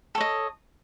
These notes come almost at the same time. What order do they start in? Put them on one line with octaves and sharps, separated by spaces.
A4 C#5 D#5